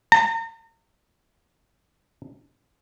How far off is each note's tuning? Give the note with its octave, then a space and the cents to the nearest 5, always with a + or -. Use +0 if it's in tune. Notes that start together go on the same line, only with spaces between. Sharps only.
A#5 -40